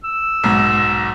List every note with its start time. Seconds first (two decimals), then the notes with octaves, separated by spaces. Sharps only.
0.04 E6
0.44 B1 G#2